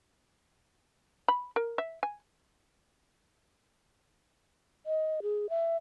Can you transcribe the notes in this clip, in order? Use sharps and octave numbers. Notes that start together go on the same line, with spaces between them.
B5
A#4
E5
G#5
D#5
G#4
E5